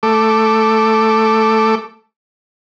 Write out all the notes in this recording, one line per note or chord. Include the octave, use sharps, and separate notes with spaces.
A3 A4 D6